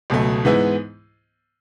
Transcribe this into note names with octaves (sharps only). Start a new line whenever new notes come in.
C#2 B2 F#3 A3
G#2 E3 G#3 B3 E4